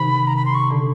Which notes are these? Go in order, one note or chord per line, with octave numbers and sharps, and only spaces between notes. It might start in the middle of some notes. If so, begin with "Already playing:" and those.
Already playing: C3 D#3 B5
A#5
B5
C6
C#6
D3